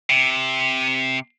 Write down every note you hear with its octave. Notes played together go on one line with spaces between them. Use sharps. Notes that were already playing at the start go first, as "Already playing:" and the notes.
C3